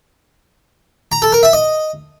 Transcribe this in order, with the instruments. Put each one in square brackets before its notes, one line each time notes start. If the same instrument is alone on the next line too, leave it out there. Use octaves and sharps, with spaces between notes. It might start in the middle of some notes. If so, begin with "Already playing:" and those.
[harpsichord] A#5
A4
A#4
E5
D#5